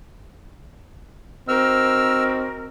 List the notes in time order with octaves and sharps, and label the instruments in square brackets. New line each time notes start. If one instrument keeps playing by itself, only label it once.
[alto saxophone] C4 [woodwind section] D#4 F#4 A#4 [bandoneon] E6 F6